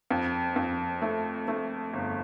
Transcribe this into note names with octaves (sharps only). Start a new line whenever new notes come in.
F2
F2
A3
A3
G1